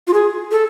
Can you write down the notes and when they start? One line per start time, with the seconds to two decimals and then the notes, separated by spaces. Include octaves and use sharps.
0.08 F4
0.14 G#4
0.52 A4